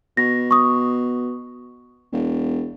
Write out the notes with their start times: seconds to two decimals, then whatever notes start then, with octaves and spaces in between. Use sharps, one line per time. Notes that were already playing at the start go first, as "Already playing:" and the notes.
0.17 B2 A#6
0.51 C#6 D#6
2.12 E1